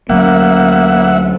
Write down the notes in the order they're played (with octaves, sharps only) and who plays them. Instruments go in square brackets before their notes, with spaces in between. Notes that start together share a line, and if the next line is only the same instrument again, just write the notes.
[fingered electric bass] D2 F#3 C#4 [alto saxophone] A#3 [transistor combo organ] E5 F#5